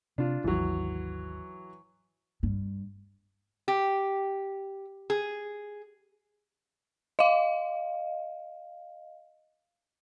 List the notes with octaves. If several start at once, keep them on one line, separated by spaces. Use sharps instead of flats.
C3 D4 F4
G#1 D#2 E3 F#3
G2
G4
G#4
D#5 F5